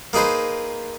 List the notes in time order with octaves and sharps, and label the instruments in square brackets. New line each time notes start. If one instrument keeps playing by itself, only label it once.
[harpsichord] A#3 D#4 G#4 B4 C5